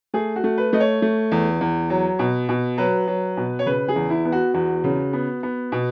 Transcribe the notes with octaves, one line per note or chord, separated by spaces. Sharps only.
A3 G#4
F#4
A3
B4
A3 D#5
C#5
A3
E2
E2
F#3
B2
B2
F#3 B4
F#3
B2
C#5
C#3 B4
G#4
E2
E4
B3
F#4
E2 F#4
C#3
B3
B3
B2